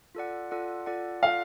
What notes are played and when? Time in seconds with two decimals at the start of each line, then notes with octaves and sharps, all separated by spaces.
0.15 F4 A4 D5 F#5
0.51 F4 A4 D5 F#5
0.86 F4 A4 D5 F#5
1.23 F4 A4 D5 F5 F#5